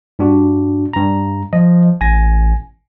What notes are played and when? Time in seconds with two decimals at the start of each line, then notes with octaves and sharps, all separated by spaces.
0.19 G2 D4 F#4
0.93 G2 A#5
1.53 F3 D#5
2.01 A1 G#5 A#6